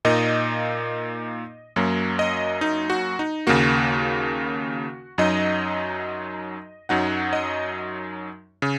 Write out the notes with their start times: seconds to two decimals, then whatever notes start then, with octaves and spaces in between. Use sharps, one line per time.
0.05 A#2 A#3 D#4 D#5
1.76 F#2 F#3 A#3
2.19 D#5
2.61 D#4
2.90 F#4
3.19 D#4
3.47 D#2 C#3 A#3 F#4
5.18 F#2 F#3 D#4 D#5
6.89 F#2 F#3 D#4 F#5
7.33 D#5
8.62 C#3